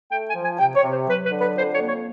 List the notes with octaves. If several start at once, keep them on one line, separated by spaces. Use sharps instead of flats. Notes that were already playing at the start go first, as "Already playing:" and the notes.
A3 G5
G#5
F3
G#5
C3 G5
C#5
C3
C5
F#3 B4
B4
D3
B4
F2 C5
C#5
A#3
C#5